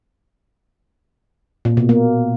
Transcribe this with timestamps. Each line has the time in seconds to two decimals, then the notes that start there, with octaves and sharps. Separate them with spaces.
1.65 A#2
1.77 B2
1.89 A#3